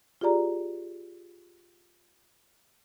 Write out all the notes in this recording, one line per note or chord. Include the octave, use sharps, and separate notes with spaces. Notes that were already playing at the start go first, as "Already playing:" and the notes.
F4 G4 G#4 D5 A#5